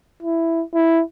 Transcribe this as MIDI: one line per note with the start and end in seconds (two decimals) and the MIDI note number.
0.23 0.63 64
0.74 1.02 64